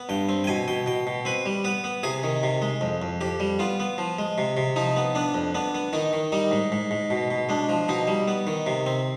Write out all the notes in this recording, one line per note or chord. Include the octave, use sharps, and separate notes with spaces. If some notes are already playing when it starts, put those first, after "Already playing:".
Already playing: B3
G2 G5
C4
G5
B2 G#5
B2 G5
B2 G5
B2
C4 B4
G3
B3 B4
B3
C3 G#4
D#3
C3
G#3
F2
F2
F2 G4
G3
B3 F4
B3
F3
G#3
C3
C3
F3 D#4
B3
B3 D4
F2
B3 D4
B3
D#3 D#4
D#3
G3 D#4
G#2
G#2
G#2
B2
B2
G#3 D4
F3
B2 D#4
G3
B3
D#3
C3
C4